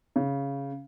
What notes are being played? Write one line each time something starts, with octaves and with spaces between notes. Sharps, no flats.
C#3